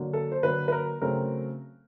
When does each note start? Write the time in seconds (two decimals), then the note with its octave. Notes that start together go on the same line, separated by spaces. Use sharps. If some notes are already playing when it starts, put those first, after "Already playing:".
Already playing: D3 F#3 A#3
0.13 A4
0.32 C5
0.43 D3 F#3 A#3 B4
0.68 B4
0.72 A#4
1.01 C#3 F#3 A3 C4 A#4